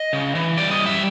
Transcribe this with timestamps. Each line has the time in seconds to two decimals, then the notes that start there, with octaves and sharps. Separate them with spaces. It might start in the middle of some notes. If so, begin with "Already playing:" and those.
Already playing: D#5
0.13 C#3
0.35 E3
0.57 G3 D5
0.71 D#5
0.79 F#2
0.86 E5